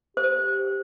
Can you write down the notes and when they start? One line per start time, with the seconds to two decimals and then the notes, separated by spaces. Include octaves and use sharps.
0.17 G4 C5